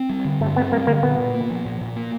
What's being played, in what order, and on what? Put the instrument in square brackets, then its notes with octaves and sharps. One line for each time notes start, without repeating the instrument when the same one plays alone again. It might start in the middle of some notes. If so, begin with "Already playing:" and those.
Already playing: [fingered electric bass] C4
G3
D3
[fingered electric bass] G2 [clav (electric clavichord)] A3
[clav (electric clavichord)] B3 [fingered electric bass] C4
[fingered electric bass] G3 [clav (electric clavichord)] A#3
[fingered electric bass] D3 [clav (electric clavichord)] A#3
[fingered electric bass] A#2 [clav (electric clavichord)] B3
[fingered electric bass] A#2
A#3
F3
A#2
A#2
A#3